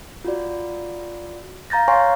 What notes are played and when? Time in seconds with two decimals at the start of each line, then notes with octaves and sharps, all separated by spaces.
0.24 F4 F#4 D5
1.70 F5 A#5 G6 A6 A#6
1.88 C#5 F5 G#5 C6 C#6